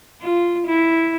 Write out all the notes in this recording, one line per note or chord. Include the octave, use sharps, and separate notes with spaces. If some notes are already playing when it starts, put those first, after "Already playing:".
F4
E4